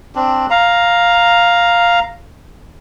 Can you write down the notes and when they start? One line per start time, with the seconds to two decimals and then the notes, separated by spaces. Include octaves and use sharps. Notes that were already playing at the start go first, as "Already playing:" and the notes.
0.15 C4 D4
0.50 F5 A#5